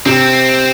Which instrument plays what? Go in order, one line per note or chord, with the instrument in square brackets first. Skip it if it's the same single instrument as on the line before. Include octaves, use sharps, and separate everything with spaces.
[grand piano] C3 [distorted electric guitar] C4